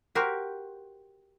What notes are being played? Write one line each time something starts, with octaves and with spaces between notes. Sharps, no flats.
F#4 G4 A#4 C5